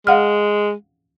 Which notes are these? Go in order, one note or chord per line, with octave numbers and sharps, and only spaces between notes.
G#3 F5 F#5 F6